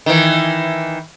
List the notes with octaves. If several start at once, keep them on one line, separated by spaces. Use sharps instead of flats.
D#3 E3